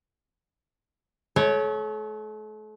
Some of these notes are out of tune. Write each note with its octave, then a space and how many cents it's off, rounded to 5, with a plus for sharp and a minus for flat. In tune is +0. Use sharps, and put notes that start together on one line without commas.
A3 -40 C#5 -5